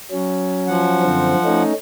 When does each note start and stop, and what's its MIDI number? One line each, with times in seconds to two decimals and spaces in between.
0.11 1.02 54
0.11 1.02 61
0.67 1.63 53
0.67 1.63 78
1.02 1.35 42
1.02 1.35 50
1.02 1.35 60
1.44 1.73 57
1.44 1.73 61
1.44 1.73 63